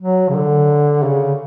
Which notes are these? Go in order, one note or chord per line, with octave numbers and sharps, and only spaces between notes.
F#3
C#3
D3
C#3